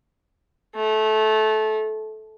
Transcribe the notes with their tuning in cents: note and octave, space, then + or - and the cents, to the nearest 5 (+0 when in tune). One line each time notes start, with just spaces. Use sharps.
A3 -20